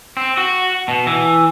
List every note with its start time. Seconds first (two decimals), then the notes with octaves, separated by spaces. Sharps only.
0.17 C4
0.37 F#4
0.88 B2
1.07 E3